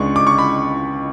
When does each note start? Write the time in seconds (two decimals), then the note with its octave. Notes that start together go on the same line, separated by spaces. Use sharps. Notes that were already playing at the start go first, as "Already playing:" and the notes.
Already playing: C#2 C#3 G#3 D4 C#6
0.16 D6
0.27 C#6
0.38 B5